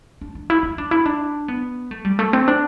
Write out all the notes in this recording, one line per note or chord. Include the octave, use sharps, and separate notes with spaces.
D4
D4
E4
E4
D4
E4
D4
B3
A3
G3
A3
C4
D4